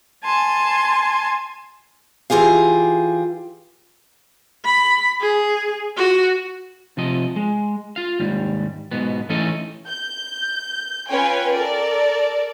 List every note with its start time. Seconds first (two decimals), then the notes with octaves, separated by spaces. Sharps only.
0.24 G#5 A5 C6
2.30 E3 F4 G4 G#4 F5
4.65 B5
5.21 G#4
5.97 F#4
6.97 C3 F3 D#5
7.36 G#3
7.96 F4 F5
8.20 D#2 G#2 G3
8.91 G#2 B2 B3
9.29 E3 A3 C#4 D#4 A4 D#5
9.88 G6
11.08 C#4 F4 B4 C#5 G5 G#5
11.52 A4 A#4 D5